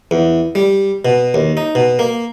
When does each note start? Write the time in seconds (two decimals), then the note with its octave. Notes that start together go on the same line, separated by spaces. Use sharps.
0.11 E2
0.55 G3
1.05 B2
1.34 D#2
1.57 D#4
1.75 B2
1.99 A#3